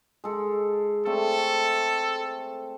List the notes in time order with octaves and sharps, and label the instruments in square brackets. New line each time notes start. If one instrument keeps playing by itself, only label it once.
[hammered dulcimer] G#3 A4
[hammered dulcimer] A3 C4 D5 [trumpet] A4